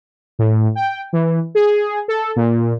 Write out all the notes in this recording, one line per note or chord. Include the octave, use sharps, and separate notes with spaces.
A2
G5
E3
G#4
A4
A#2